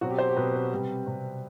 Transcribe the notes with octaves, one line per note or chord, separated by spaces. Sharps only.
B2 F#3 C4 F#4
G4
C5
G4
B2 F#3 C4 B4
B4
C3 G3 C4
C3 G3 C4